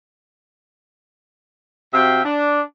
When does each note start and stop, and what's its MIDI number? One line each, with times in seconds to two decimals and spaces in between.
1.94 2.22 48
1.94 2.22 66
1.94 2.22 76
1.94 2.22 77
1.94 2.22 79
2.25 2.62 62